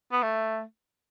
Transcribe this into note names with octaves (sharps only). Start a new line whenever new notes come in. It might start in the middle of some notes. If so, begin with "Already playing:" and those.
B3
A3